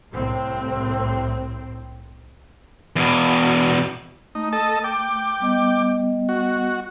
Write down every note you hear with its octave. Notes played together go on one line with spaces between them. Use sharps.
C2 A2 C4
E2 B2
A3 D#4
A4 D#5 A5
G5 D6
G3 B3 D#5
F#4